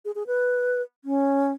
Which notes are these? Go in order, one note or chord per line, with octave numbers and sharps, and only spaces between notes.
G#4
G#4
B4
C#4